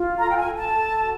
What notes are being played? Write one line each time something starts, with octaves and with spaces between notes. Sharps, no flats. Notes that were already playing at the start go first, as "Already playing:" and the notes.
Already playing: F4
A4 A#5
G5
G#5
A4
A5
A4
F#4